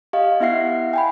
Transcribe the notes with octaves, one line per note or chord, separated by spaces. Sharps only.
G4 D#5 F5
B3 E4 E5 F#5 C7
G5 G#5 B5